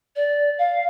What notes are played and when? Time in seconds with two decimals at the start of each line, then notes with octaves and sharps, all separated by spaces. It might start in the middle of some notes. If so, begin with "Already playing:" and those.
0.16 D5
0.58 F5